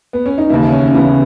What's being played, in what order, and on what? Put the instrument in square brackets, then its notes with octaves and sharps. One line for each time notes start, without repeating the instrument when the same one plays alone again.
[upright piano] B3
C#4
D#4
D#2 C#3 E3 E4
C#4
C#4
D#2 C#3 E3 B3